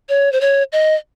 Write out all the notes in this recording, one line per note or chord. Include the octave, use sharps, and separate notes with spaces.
C#5
C5
C#5
D#5